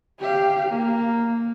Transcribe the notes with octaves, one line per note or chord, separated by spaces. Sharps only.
G4 F5
A#3